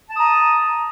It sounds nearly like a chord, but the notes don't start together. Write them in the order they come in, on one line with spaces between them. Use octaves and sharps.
A5 D#6 A#5